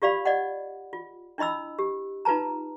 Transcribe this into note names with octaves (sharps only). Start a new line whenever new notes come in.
F4 G4 D5 F5 B5
D5 D#5 F#5
F4
D4 E4 D#5 B5 E6
G4
D#4 F4 B4 A5 A#5